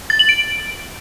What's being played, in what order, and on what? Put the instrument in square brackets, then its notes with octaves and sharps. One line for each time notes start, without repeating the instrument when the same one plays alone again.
[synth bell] A6
F#7
D7